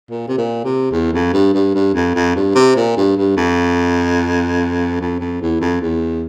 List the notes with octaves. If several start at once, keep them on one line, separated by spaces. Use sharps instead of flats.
A#2
C3
A#2
C3
E2
F2
G2
G2
G2
F2
F2
G2
C3
A#2
G2
G2
F2
F2
F2
E2
F2
E2